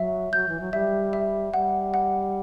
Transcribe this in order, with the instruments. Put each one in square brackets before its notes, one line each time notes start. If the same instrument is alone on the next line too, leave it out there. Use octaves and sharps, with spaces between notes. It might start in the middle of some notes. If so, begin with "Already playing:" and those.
Already playing: [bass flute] F#3 [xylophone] E5
[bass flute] F#3 [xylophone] G6
[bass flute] E3
F#3
[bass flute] G3 [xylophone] E5
[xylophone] E5
[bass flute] G3 [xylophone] F#5
[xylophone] F#5